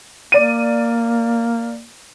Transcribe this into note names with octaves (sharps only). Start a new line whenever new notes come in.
A#3 D5 D#7